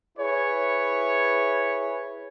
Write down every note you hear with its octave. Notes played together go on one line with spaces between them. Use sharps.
E4 G#4 B4 C#5